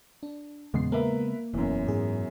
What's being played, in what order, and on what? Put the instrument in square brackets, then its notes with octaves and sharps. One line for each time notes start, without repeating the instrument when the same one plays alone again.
[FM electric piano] D4
[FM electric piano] E2 A#2 C7 [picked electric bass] C#3 G#3 B3
[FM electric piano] A#3 [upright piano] A#4 B4 E5
[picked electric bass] E1 [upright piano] F#2 B2 E3
[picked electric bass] G#2 [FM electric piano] G#4